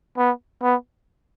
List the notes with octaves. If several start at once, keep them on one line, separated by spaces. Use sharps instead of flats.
B3
B3